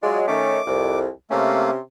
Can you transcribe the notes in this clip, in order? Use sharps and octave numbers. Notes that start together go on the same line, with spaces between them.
F#3 G#3 F4 D5
D#3 A3 C#4 D6
C2 F2
C3 A3 A#3 C#4